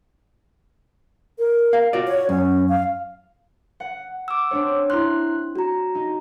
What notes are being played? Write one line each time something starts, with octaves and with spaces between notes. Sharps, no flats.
A#4
F5
F4 F#4 D5
C#5
F#2 C#4
F5
F#5
D6 E6
C4 D4 C#5
E4 C6 F6 F#6
F#4 A#5
D#4